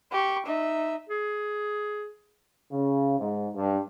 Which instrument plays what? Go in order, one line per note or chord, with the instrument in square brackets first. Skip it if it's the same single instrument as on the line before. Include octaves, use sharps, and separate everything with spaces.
[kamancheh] G4 C#6
D#4 E5
[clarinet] G#4
[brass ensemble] C#3
G#2
G2